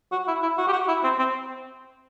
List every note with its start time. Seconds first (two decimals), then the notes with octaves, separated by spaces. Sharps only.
0.12 F#4
0.28 E4
0.43 E4
0.58 F#4
0.68 G4
0.73 F#4
0.88 E4
1.04 C4
1.19 C4